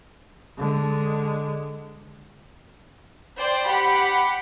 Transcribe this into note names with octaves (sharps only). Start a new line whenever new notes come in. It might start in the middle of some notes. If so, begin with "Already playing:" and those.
D3 G#3
C5 D5 G5
G4 F#5 B5